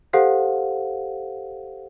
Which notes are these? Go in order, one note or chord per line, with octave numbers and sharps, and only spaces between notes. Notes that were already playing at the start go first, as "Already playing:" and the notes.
G4 A4 C5 F5 F#5